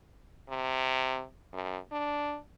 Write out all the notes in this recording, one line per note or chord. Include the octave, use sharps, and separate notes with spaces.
C3
F#2
D4